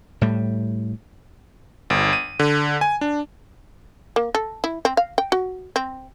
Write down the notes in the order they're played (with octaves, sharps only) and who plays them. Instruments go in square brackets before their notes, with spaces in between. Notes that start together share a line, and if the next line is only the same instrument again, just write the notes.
[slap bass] A2 G3
[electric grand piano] G1
D#7
D3
G#5
D4
[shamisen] A#3
A4
E4
C4
F5
G5
F#4
C4